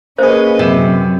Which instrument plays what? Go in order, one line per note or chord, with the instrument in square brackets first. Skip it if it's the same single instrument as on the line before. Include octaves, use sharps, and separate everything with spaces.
[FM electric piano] A#3 G#4 [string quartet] C#4 B4 D#5 [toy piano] C5
[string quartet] F#2 [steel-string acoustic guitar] C3